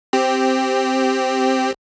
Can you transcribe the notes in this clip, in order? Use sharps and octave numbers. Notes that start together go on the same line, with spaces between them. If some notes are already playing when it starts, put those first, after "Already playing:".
C4 G4